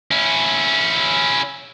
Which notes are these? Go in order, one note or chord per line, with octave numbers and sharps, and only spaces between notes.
C#4 E4